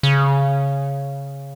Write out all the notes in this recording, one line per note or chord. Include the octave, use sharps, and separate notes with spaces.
C#3